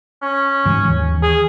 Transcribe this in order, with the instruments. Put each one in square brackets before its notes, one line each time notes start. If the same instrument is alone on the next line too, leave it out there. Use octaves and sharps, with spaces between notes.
[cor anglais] C#4
[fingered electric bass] G#2 E3 G#3
D#2 E3
[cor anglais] G#4